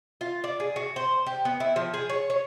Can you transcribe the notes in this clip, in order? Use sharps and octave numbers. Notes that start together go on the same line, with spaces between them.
F4
D5
G#4
F#4
C5
G4
B3
E4
F3
G#4
C#5
C#5